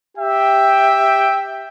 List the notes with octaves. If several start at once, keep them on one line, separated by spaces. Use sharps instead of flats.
G4 E5 G5